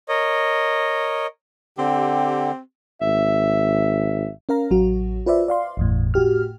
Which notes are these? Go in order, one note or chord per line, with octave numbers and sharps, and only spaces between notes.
A#4 C#5 D#5
D3 C4 G4
G#1 E5
C#4 A#4 F5 A#5
A1 F#3 F#4
F4 B4 C5 D5 E5
D5 F5 C6
G1 E2 A2
A2 F#4 G4 F6